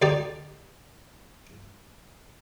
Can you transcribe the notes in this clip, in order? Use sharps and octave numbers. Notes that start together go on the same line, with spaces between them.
D2 D3 D#4 G4 D5